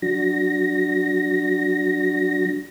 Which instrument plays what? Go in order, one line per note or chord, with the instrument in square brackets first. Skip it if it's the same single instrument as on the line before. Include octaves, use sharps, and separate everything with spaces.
[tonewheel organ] F#3 D4 F#4 A#6